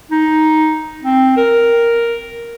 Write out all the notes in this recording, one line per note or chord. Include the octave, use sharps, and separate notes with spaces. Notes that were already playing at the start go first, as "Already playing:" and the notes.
D#4
C4
A#4